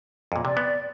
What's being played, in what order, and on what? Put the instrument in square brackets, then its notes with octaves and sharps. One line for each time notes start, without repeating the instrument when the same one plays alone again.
[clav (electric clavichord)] F2 A#2
[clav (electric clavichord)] C3 [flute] D5
[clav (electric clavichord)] B3